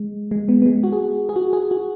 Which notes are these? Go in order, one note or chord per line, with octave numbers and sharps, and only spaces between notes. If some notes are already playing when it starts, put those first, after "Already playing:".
Already playing: G#3
G#3
B3
B3
G#3
F#4
G#4
G#4
F#4
G#4
F#4